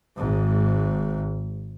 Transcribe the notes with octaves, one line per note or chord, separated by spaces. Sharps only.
G#1 G#2